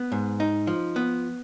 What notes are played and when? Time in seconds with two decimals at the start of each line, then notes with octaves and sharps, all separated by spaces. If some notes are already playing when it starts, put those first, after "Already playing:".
Already playing: B3
0.12 G#2
0.40 D#4
0.67 F3
0.96 B3